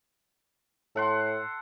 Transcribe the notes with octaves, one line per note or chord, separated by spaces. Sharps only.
A2 A4 F#5 C6